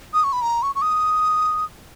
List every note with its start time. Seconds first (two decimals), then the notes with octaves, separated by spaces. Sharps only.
0.14 D#6
0.24 C#6
0.33 B5
0.42 A#5
0.63 C#6
0.75 C#6
0.82 D#6